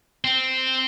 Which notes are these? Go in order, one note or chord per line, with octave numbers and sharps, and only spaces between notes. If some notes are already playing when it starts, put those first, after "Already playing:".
C4